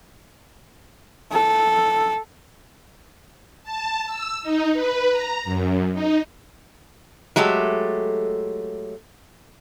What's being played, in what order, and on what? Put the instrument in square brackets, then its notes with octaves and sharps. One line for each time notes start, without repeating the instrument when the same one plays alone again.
[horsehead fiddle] A4
[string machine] A5
E6
D#4
B4
A#5
F#2
D#4
[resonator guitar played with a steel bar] F#3 G#3 A3 G4 A4